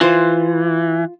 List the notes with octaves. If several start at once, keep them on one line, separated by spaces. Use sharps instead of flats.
E3 F4 C5